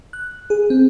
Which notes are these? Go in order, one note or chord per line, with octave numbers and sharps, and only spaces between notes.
F#6
G#4
C4